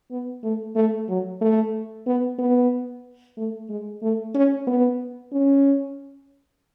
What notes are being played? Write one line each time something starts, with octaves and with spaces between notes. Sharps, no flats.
B3
A3
A3
F#3
A3
B3
B3
A3
G#3
A3
C#4
B3
C#4